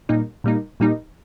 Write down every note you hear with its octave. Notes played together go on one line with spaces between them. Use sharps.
A#2 G3 A#3 D#4
A#2 G3 A#3 D#4
A#2 G3 A#3 D#4